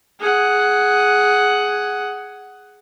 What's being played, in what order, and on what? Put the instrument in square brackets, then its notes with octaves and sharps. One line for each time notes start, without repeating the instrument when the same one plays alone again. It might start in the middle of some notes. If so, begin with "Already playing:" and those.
[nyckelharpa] G#4 F#5